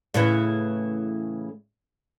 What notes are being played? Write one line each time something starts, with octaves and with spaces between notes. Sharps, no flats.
A2 C#3 E3